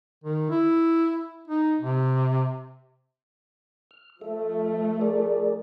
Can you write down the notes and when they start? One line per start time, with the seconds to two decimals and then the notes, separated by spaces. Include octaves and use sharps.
0.24 D#3
0.50 E4
1.48 D#4
1.81 C3
3.91 F6
4.21 F3 A3 A4 E5
5.01 G#4 A#4 D5